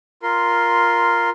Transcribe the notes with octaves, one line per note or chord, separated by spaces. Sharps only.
F4 A#4 C6